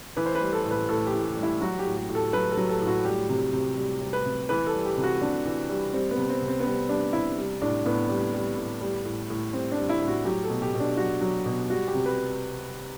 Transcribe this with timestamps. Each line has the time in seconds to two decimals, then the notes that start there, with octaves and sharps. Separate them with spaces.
0.17 E3 B4
0.26 C5
0.35 B4
0.41 G3
0.53 A4
0.65 A2
0.71 B4
0.89 A2 A4
1.07 G4
1.14 E3
1.25 G4
1.37 G3
1.43 E4
1.61 F#3 F#4
1.79 G4
1.86 A2
1.97 G4
2.09 A2
2.15 A4
2.33 F#3 B4
2.52 A4
2.57 F#3
2.69 A4
2.82 A2
2.87 F#4
3.05 G3 G4
3.29 C3
3.53 C3
3.77 G3
4.01 G3
4.13 B4
4.26 C3
4.49 E3 B4
4.67 A4
4.73 G3
4.85 G4
4.98 C3
5.03 F#4
5.21 C3 D4
5.46 E3
5.70 G3
5.93 G3 C4
6.11 B3
6.17 C3
6.29 C4
6.42 C3
6.48 C4
6.60 B3
6.66 G3 C4
6.89 G3 D4
7.13 C3 E4
7.38 G3
7.62 A2 D4
7.86 A2 B3
8.09 G3
8.34 G3
8.57 A2
8.81 G3
9.05 A2
9.30 A2
9.53 G3 C4
9.72 D4
9.78 G3
9.89 E4
10.02 A2
10.08 F#4
10.25 F#3 G4
10.44 A4
10.50 B2
10.62 G4
10.74 B2
10.80 D4
10.97 F#3 F#4
11.21 F#3
11.46 B2
11.70 G3 F#4
11.88 G4
11.94 C3
12.06 B4